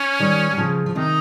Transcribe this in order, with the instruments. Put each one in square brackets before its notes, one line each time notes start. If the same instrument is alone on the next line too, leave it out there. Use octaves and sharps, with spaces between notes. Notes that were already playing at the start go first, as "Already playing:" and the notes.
Already playing: [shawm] C#4
[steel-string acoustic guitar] D#3 G3
G3
C#3 F3
F3
[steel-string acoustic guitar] C3 D#3 [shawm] D#4